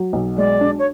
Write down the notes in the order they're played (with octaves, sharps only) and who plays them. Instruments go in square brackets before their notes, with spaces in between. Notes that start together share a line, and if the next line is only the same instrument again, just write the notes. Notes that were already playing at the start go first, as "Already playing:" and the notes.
Already playing: [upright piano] F#3
B1
[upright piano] G#3 [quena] D5
[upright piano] D4
[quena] C#5